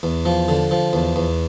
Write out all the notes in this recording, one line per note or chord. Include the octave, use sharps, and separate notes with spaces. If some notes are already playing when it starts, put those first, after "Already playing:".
E2
F3
D3
F3
E2
E2